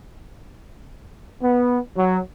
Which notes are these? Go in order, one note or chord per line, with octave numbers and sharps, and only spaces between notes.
B3
F#3